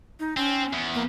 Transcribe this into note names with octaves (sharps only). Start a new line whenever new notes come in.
D#4
C4 C#4
E2
A#3